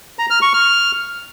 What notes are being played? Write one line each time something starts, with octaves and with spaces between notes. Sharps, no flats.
A#5
F6
C#6
F6